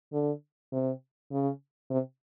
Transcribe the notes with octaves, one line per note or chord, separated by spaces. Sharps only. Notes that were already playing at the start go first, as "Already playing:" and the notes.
D3
C3
C#3
C3